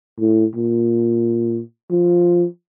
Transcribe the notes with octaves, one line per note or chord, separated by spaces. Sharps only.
A2
A#2
F3